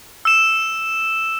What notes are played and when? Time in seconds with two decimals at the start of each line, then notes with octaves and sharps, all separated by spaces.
0.25 E6 E7